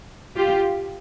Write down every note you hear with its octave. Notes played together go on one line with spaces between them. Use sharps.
F4 G4